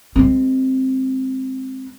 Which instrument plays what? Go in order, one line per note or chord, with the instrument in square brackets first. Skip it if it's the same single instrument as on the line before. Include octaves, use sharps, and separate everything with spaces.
[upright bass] G#3 C4